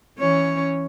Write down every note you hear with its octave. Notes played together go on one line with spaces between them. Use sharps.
E3 C#4 C#5